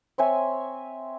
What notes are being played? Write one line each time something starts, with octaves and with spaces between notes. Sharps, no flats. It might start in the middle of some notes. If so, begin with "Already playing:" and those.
C4 C#5 E5 G#5